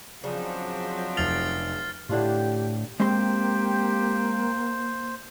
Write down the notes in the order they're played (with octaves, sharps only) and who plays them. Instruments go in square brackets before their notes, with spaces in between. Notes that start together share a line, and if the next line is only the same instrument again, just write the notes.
[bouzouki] C#3 D4 D#4 [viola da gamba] F3 F#3 C4
[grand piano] F1 F7 [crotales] F6 A6 C7
[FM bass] A2 [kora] D3 D4 F4 [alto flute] G4
[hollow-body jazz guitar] G#3 C4 C6 [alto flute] A#3 [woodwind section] G4 G5 [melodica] C5